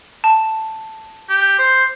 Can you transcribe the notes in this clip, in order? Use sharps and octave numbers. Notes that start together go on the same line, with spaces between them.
A5
G4
C5